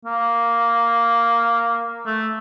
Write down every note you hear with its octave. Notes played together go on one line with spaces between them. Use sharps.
A#3
A3